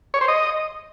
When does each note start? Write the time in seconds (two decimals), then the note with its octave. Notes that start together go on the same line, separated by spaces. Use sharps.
0.14 C#5
0.21 C5
0.28 D#5